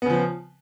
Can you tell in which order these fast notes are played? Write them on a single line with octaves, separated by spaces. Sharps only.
B3 C#3 F3